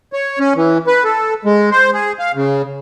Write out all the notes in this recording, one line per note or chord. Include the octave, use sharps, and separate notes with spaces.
C#5
C#4
E3
B4
A4
G#3
C5
G#4
F5
C#3